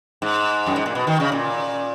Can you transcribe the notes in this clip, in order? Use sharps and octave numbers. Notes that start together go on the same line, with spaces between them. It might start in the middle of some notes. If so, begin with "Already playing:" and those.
G#2
F#2
G#2
A#2
B2
D#3
C#3
A#2